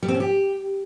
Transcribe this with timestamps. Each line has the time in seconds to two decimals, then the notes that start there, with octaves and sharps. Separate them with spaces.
0.03 G3
0.08 C4
0.14 C#4
0.20 G4